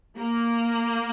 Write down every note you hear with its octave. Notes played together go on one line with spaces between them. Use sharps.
A#3